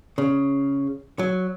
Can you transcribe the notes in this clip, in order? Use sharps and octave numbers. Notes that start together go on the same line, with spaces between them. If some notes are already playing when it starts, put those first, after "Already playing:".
C#3
F#3